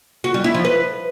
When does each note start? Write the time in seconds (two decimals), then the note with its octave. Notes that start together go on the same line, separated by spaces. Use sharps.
0.24 F#4
0.34 G3
0.44 E4
0.54 F3
0.65 B4